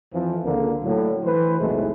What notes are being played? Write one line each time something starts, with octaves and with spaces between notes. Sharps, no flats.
F2 E3 F3
C#2 D3 A#3
A2 D3 F#3
E3 B4 C5
B1 E2 A2 C3 G#3 A3